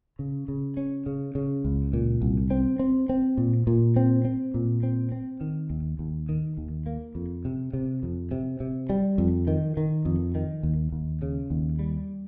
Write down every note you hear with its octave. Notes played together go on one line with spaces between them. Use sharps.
C#3
C#3
C#4
C#3
C#3
C#2
A#2
C2
C4
C4
C4
A#2
A#2
C4
C4
A#2
C4
C4
D#3
D#2
D#2
D#3
D#2
A#3
F2
C3
C3
F2
C3
C3
G3
F2
D#3
D#3
F2
D#3
D#2
D#2
C#3
D#2
G3